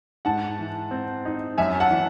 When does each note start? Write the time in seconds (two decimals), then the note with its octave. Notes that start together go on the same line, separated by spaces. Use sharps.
0.25 G#2 F#5 A5
0.59 E3
0.91 C4
1.25 D#4
1.58 F#2 E5 G#5
1.80 F#5 A5
1.91 E3